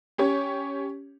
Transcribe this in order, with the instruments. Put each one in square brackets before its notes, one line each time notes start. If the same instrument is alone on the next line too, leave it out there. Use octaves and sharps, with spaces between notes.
[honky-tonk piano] C#4 G4 C#5